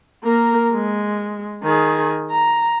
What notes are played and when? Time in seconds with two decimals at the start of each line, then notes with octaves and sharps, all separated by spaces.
0.24 A#3 A#4
0.73 G#3
1.63 D#3 G#4
2.31 A#5